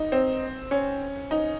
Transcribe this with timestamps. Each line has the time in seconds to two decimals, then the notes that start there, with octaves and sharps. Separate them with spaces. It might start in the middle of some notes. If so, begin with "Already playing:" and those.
Already playing: D#4
0.12 C4
0.71 C#4
1.31 D#4